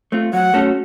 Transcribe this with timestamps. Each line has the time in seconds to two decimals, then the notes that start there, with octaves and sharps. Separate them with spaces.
0.12 A3 C4 F4
0.33 F#3 F#5
0.54 A3 C#4 F#4 A4